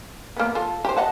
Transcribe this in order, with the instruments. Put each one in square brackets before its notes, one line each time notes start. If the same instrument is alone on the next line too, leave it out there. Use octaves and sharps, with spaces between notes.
[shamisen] A#3 B3
F4 A4
G4 C5
D#5 F#5 A5